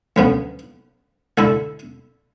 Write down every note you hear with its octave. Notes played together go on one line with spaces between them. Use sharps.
D2 C#3 F#3 B3
D3 A3 E4 A4